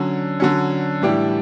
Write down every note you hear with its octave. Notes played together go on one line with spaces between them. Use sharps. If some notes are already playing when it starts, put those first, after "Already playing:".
Already playing: D3 F#3 C#4
D3 F#3 C#4
A2 E3 G3 D4 G4